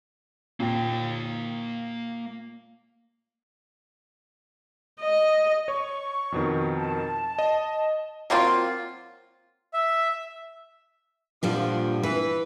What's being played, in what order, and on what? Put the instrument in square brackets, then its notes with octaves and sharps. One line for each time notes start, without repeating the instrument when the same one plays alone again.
[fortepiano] A#2 [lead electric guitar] A#3 G5
[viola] D#5
[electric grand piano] C#5 [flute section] C#6
[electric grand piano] F2 B2 D#3
[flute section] A5
[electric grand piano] D#5
[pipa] F#3 A#3 C4 F4
[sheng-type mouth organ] E5
[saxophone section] G2 D3 F3 [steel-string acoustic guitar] A#2 G3 D4
[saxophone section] E3 [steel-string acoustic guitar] B4